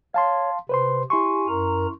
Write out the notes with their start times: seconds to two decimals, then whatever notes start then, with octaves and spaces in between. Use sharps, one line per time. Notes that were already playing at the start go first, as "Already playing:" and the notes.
0.14 C#5 F5 A5 C6
0.69 C3 B4 C5 C6
1.10 E4 G4 G#5 C6 C#6
1.48 F#2 A#4 A#5